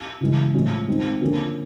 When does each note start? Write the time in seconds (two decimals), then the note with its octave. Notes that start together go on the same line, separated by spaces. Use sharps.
0.21 C#3 E3 G#3
0.54 A2 F3 G#3 C#4
0.88 D#3 G#3 C4
1.21 D3 F3 A#3 C#4